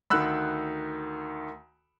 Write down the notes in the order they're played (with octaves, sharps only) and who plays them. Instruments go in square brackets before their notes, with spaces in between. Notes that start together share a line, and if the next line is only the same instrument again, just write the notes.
[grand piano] D2 D#3 [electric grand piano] B5 E6 F#6